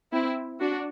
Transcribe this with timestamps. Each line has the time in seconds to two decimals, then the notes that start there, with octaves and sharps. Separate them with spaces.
0.12 C4 E4
0.60 D4 F#4